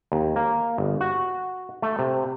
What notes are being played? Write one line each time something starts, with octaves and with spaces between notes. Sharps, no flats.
D#2
A#3
G1
F#4
A3
C3